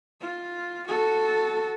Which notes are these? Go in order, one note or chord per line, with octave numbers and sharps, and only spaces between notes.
F4
F#4 A4